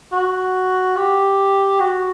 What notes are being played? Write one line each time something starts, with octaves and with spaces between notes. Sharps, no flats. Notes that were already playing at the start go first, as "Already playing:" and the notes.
F#4
G4
F#4